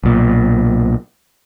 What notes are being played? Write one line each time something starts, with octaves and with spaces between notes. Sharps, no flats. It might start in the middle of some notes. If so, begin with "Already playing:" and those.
B1 A#2